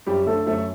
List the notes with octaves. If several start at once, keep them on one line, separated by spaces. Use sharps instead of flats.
F#2 G3 G4
D3 A3 A4
F#2 A3 A4